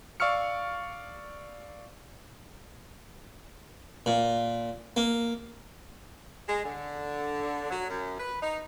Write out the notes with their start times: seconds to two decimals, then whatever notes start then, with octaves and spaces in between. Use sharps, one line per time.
0.20 D5 F5 C#6 E6 F6 C#7
4.06 A#2
4.96 A#3
6.48 G#3
6.65 D3
7.70 F#3
7.89 F#2
8.20 B4
8.42 D#4